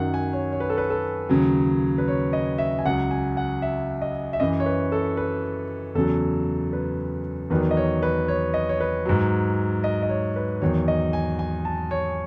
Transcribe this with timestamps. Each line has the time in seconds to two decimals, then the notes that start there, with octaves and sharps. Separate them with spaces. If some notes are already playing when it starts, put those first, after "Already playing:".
Already playing: F#2 D#3 F#3 F#5
0.14 G#5
0.33 C#5
0.52 C#5
0.60 B4
0.70 A4
0.78 B4
0.90 A4
1.29 D#2 C#3 F#3
1.98 B4
2.08 C#5
2.33 D#5
2.58 E5
2.79 G#5
2.86 C#2 C#3 F#3 F#5
3.11 G#5
3.37 F#5
3.62 E5
4.02 D#5
4.33 E5
4.40 F#2 E3 D#5
4.60 C#5
4.66 B4
4.92 A4
5.17 B4
5.95 E2 C#3 F#3 A4
6.73 B4
7.50 E2 D#3 F#3 B4
7.71 D#5
7.77 C#5
8.03 B4
8.28 C#5
8.54 D#5
8.69 C#5
8.80 B4
9.06 G#2 F#3
9.84 D#5
10.02 D#5
10.09 C#5
10.36 B4
10.61 E2 D#3 F#3 C#5
10.88 D#5
11.13 G#5
11.39 G#5
11.65 A5
11.91 C#5